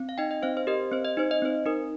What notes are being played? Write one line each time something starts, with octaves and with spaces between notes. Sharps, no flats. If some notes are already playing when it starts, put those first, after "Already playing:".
Already playing: C4
F5
D#4 D#5 G5
D#5
C4 C5 F5
C5
G4 A#4 D#5
C4 C5
D#5
D#4 C5
D#5
C4 C5
D#4 A#4